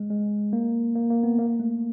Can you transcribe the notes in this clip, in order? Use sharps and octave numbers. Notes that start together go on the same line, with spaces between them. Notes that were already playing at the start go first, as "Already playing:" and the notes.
Already playing: G#3
G#3
A#3
A#3
A#3
B3
A#3
A3